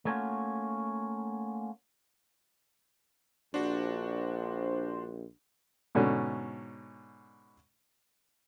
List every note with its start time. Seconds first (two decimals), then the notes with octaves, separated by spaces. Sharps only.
0.05 A3 A#3 C#4 F4 F#4
3.54 A#1 D4 F#4 C5
5.95 G#2 B2 D3 C#4